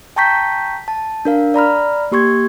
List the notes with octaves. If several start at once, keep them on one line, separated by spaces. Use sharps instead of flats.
G5 A5 A#5 C#6 G6 B6
A5
D4 A#4 F5
D5 A#5 B5 F6
A#3 G4 C6 C#6 G#6